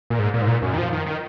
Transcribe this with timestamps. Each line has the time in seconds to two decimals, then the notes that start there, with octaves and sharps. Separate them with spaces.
0.10 A#2
0.19 G#2
0.34 A#2
0.41 G#2
0.48 A#2
0.62 F#2
0.74 D#3
0.78 F3
0.93 D#3
1.06 D#3